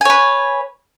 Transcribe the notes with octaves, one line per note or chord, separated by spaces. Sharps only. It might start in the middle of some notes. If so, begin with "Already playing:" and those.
B4 C#5 G#5